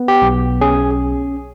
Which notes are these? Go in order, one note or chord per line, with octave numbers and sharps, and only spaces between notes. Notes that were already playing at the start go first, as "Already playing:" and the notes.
Already playing: B3
G4
B1
C#4 G#4